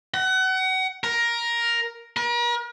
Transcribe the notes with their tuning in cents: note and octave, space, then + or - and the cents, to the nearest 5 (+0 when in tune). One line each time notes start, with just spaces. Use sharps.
F#5 +30
A#4 +10
A#4 +45